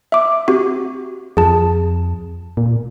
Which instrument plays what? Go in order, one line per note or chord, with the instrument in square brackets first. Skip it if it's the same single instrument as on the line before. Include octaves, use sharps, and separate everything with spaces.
[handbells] E5 D6
C4 F#4 G4
[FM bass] F2 [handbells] G#4 A5
[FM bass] A#2